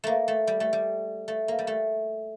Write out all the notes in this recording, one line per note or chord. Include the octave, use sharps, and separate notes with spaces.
A3 A#3
A3
G3
A3
G3
A3
A#3
G3
A3